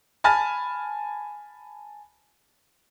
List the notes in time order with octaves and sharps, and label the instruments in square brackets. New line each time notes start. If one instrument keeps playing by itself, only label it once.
[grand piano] G#5 A5 B5 F6 A6